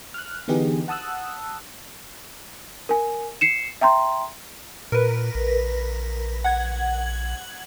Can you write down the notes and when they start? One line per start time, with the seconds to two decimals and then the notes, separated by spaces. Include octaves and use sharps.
0.14 F6 F#6
0.48 D3 E3 B3 D#4 G4 G#4
0.88 F#5 A5 D#6 E6 F#6
2.89 A#4 G#5
3.41 C7 C#7 E7
3.81 E5 G5 A#5 C6
4.92 A#2 A#4 B4
5.35 A#1
6.44 F#5 G#6